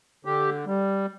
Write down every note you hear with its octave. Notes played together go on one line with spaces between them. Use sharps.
D3 G4
G3